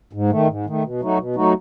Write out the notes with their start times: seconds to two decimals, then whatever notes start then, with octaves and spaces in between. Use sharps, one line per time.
0.13 G#2
0.30 D#3 A3
0.48 G#2
0.66 D#3 A3
0.83 B2
1.01 F#3 A3 D#4 F#4
1.18 B2
1.36 F#3 A3 D#4 F#4